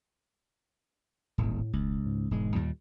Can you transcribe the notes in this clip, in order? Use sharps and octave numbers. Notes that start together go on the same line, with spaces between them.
D#1 G#1 A2
E1 C#2
G#2
E1 G#2 G#3
D#2 A#2 G3